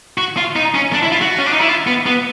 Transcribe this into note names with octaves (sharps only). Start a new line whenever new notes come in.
F#4
F4
D#4
C#4
D4
E4
F4
F#4
C#4
D4
D#4
E4
F4
B3
B3